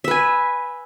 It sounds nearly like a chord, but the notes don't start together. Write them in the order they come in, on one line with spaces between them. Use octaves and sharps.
E5 B4 G#5